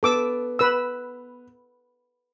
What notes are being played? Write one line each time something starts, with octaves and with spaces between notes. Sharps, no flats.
B3 A4 D6 E6
B4 E6